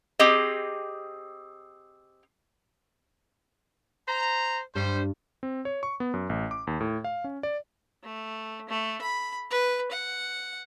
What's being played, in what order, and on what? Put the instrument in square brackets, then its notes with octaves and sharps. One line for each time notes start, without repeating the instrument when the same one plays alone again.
[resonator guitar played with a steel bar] C4 G4 G#4 D#5
[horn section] C5 A#5
[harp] G2 [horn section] G3 C5
[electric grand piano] C4
C#5
C#6
B3
F#2
A1
D6
D#2
A2
F5
C#4
D5
[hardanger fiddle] A3
A3
B5
B4
F#5